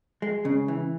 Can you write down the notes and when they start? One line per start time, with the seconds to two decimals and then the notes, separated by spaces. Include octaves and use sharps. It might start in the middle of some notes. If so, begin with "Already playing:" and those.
0.22 G#3
0.45 C#3
0.68 E3